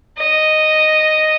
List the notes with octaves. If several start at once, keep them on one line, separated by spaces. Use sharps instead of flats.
D#5